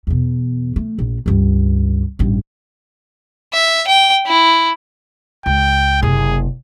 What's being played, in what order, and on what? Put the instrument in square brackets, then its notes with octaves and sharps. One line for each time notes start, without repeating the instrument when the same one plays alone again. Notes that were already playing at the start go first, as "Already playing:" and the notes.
[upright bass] E2 B2
A3
A#1
C#2 G2
A1 G2
[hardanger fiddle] E5
G5
E4
[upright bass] C#2 [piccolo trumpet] G5
[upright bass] F#1 C3 [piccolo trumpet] G#4